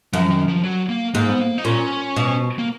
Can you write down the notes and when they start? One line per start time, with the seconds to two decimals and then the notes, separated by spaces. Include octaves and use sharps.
0.13 F#2 F3
0.30 D#3
0.48 F3
0.64 F#3
0.89 A#3
1.15 G#2 A#3
1.30 B3
1.40 A#3
1.58 D#4
1.65 A#2 C#4
2.16 B2
2.59 A#3